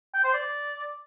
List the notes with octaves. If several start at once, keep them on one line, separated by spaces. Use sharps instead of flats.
G5
C5
D5